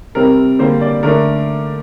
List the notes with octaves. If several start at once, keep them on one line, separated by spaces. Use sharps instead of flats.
C3 G3 C4 A#4
D3 G3 A#3 C5
D5
D3 A3 D4 A#4